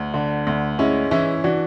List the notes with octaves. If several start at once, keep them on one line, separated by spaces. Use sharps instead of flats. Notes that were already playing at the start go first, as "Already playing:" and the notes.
Already playing: D2 D4
D3
D2
G#3 C#4 E4
E3 C#4 E4
E3 D4 F#4